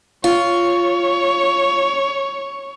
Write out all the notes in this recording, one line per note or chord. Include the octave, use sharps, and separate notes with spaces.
F4 C#5